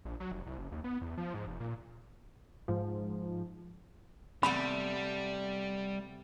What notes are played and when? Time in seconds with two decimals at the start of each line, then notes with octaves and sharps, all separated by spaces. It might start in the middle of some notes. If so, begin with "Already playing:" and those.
0.05 A#1
0.20 F#3
0.32 F1
0.47 C2
0.58 F#1
0.72 D#2
0.84 B3
1.02 E2
1.18 F3
1.34 G#2
1.47 F1
1.60 A#2
2.68 G#2 F3
4.43 C3 G3 A3 B3 B5